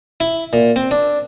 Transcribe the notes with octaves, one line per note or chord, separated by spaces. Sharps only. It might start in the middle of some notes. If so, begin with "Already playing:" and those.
E4
A#2
C4
D4